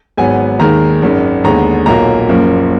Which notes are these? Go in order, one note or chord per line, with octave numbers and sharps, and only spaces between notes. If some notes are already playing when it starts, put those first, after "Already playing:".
G#1 G#2 F#3 B3 G#5
D#2 D#3 G#3 A#5
G#1 F#2 D#3 G#3
D#2 D3 G#3 B3 A#5
B1 A#2 F#3 A#3 A#5
F#1 F#2 F3 A#3